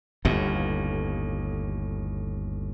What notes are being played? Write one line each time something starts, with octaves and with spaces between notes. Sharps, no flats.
G1 D#2 A2